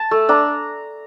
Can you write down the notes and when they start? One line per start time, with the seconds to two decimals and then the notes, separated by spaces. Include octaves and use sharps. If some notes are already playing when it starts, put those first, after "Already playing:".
Already playing: A5
0.11 A3
0.29 D4 A#5